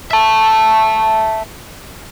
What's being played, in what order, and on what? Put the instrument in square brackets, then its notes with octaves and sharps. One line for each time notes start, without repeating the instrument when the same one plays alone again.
[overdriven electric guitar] E5 A5